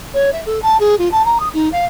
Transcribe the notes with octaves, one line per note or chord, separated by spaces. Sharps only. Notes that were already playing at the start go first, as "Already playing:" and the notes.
C#5
E5
A4
A5
G#4
F4
A5
A#5
D#6
D#4
F5